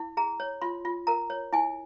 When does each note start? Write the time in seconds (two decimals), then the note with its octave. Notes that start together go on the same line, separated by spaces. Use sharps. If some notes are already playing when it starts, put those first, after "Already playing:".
Already playing: E4
0.17 G#4 A#5
0.40 C#5
0.62 F4 C6
0.85 F4
1.07 A#4 A#5
1.30 C#5
1.53 E4 G#5